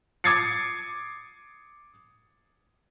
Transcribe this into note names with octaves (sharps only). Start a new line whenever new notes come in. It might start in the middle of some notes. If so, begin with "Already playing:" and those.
D6 D#6 G#6 A6 C7 C#7